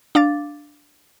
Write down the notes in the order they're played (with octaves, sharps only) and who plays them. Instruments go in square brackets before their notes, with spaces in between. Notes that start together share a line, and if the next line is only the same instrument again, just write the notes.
[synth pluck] D4 F5 D6 A6